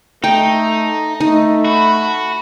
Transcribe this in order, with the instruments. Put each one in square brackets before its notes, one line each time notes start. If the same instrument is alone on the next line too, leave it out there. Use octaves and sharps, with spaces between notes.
[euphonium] A3 [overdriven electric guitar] D#4 [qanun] G5
[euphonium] A3 [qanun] D#4
[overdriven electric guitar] F#4 [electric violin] B5